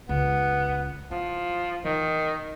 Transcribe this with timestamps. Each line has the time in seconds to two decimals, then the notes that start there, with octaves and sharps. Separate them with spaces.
0.09 C#2 B3
1.11 F3 E4
1.85 D#3 E3